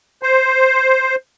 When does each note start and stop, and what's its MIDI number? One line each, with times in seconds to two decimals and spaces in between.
0.23 1.15 72